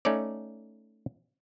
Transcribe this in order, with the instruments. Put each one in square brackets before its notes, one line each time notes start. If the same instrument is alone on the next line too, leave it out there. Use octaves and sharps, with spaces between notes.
[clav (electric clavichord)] A3 C#4 D#4 C#5 D5